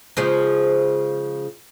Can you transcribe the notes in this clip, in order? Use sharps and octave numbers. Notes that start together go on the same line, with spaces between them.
C#3 F3 G#3